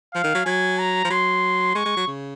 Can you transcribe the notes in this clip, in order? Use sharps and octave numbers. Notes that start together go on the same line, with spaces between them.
F3 F5
D#3
F#3
F#3 G#5
A#5
F3
F#3 C6
G#3 C#6
G#3
F#3
C#3